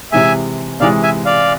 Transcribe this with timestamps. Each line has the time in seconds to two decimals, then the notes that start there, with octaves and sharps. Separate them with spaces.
0.12 C3 E3 G#3 E5 G#5
0.80 C3 E3 G#3 D5 F5
1.03 E5 G#5
1.25 D5 F5